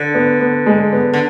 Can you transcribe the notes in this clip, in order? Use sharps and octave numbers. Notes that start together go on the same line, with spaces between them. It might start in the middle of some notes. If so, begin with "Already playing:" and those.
Already playing: D3
B3
B3
G#3
B3
D3